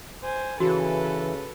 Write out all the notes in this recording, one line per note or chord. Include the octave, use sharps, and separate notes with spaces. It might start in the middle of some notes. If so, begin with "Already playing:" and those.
C5 G#5
C#3 E3 F#4 A4 B4